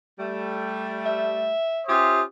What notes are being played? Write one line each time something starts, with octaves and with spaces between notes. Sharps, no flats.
G3 A3
E5
C#4 F4 G4 C5 E5 D#6